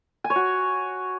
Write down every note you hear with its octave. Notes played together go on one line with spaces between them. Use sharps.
G#5
C#5
F#4